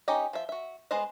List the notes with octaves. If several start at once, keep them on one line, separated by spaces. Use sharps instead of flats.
C#4 D#4 G4 D#5
F3 E5
F#4 E5
G#3 B3 C5 D#5